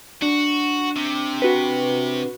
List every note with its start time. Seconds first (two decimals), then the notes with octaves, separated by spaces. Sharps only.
0.22 D4 F#4
0.96 C3
1.42 F#4 B4